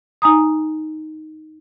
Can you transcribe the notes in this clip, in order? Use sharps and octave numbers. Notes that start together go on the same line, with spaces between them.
D#4 G#5 A#5 D#6